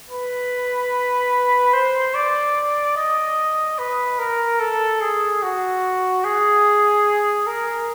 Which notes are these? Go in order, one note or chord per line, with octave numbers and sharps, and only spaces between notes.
B4
C5
D5
D#5
B4
A#4
A4
G#4
F#4
G#4
A#4